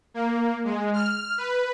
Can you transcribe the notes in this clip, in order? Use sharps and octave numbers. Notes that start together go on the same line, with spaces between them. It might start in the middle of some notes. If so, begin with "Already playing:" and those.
A#3
G#3
F6
B4